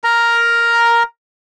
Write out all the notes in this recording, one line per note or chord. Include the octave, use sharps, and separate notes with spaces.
A#4 A#5